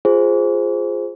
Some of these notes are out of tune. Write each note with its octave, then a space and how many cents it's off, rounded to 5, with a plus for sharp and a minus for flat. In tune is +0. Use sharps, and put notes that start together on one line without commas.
F4 +0 G#4 +0 C5 +0